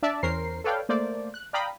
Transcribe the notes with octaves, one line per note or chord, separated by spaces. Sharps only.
D4 D5 E5 A5
E2 C#4 A#4 C5 C7
A4 B4 C#5 D5 F5 G5
A3 A#3 C5 D5
F#6
D5 F5 G5 A#5 B5 D#6